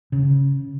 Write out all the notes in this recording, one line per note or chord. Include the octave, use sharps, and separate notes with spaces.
C#3